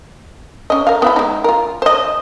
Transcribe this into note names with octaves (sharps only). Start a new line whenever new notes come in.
C#4 D#5
A#4 F5
B3 E4 B5
G#3 D#4
F4 A#4
C5 D#5